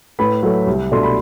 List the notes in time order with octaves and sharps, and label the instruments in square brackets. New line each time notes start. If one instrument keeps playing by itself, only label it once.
[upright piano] A2 B4 B5
F#3 A3
C2
B2 A3 D4 C6
B5